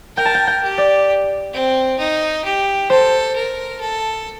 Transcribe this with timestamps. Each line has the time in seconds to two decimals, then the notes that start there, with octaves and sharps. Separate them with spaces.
0.17 A#4 G5
0.25 A5
0.34 G5
0.47 G5
0.63 G4
0.78 D5
1.53 C4
1.99 D#4
2.44 G4
2.90 A4 C5
3.35 A#4
3.80 A4